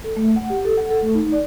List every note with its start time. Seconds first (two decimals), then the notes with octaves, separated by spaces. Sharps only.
0.04 A4
0.17 A3
0.36 F#5
0.50 G4
0.65 A4
0.77 F#5
0.90 A4
1.02 A3
1.14 D#4
1.32 D5